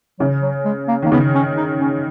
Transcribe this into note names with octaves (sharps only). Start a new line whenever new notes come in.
C#3 F#3
F#3
G#3
A#3
D#3 A#3
C#3 B3
C#4
D#4
C#4